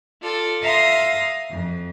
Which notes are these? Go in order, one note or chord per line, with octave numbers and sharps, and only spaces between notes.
F4 A4 D5
E5 F5 A#5 C6 D#6
F2